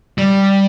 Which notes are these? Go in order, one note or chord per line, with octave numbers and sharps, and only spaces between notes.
G3